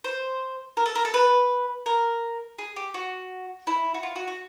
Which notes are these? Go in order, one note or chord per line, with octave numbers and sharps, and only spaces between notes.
C5
A#4
A4
A#4
A4
B4
A#4
G#4
G4
F#4
E4
F#4
F4
F#4
F#4